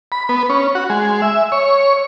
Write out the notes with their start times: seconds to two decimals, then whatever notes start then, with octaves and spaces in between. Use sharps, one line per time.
0.12 B5
0.29 B3
0.50 C#4
0.75 F#4
0.89 G#3
1.22 E5
1.52 C#5